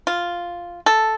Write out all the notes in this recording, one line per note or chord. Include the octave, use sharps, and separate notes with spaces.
F4
A4